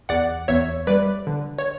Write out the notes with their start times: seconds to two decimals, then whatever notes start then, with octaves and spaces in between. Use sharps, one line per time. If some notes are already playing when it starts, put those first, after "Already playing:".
0.09 E2 D5 F#5
0.48 E2 C#5 E5
0.87 G3 B4 D5
1.27 D3
1.58 C#5